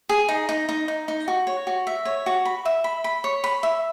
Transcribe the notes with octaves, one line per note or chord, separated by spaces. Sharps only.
G#4
D#4
D#4
D#4
D#4
D#4
F#4
C#5
F#4
E5
C#5
F#4
B5
E5
B5
B5
C#5
B5
E5